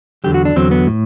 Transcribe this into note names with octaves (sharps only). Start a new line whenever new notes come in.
E2 D3 F#3 G4
F#4
D4
E2 D3 F#3 C4
B3
A2